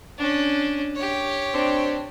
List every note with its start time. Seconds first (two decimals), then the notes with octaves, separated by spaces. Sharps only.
0.18 C#4 D4
0.96 G4 C#5
1.53 C4 D4